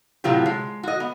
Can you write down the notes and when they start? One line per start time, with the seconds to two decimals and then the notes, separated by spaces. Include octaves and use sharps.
0.24 A2 C3 F#3 F4 G4
0.46 G#3
0.83 F#4 D#5
1.00 B3